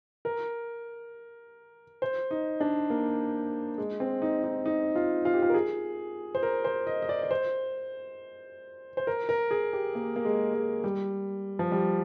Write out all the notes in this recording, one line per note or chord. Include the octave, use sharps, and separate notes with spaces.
A#4
C5
D#4
D4
A#3
G#3
C4
D#4
D#4
D#4
F4
F4
G4
F4
A#4
G#4
C5
A#4
C5
D#5
D#5
D5
D5
C5
C5
A#4
A#4
G#4
G4
A#3
A#3
G#3
G#3
G3
F3
G3